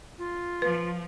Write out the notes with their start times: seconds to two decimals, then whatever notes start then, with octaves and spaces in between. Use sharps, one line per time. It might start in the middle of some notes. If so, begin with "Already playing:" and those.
0.18 F4
0.62 F3 B4